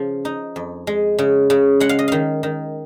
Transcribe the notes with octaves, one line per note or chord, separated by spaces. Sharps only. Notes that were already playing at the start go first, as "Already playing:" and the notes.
Already playing: C#3 F3
D#4
F2
G#3
C#3
C#3
G#3 F#5
F5
D#5
D#3 F5
D#3